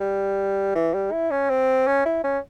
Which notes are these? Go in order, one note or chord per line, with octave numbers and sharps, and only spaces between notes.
G3
E3
G3
E4
C#4
C4
C#4
E4
C#4